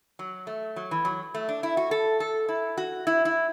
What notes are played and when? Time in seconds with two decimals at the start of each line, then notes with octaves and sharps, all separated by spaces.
0.19 F#3
0.47 A3
0.76 F#3
0.91 E3
1.05 F#3
1.34 A3
1.49 D4
1.63 E4
1.77 F#4
1.91 A4
2.20 A4
2.48 E4
2.77 F#4
3.07 E4
3.25 E4